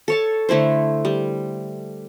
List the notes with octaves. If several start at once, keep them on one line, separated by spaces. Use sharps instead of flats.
A4 C#5 A5
D3 A3 E4 C5
G3